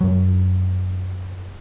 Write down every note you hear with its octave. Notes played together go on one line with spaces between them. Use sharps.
F#2 F#3